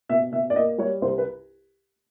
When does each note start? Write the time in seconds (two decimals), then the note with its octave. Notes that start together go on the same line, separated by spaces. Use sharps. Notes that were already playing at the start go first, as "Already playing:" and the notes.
0.09 B2 E5
0.32 B2 E5
0.50 D5
0.55 A#3 D#5
0.78 G3 C#5
1.02 C2 C5
1.18 B4